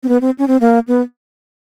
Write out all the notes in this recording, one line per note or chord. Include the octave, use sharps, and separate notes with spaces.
C4
B3
C4
C#4
C4
A#3
B3